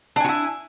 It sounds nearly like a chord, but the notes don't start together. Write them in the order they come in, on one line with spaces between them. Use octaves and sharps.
D4 G#5 F#4 E4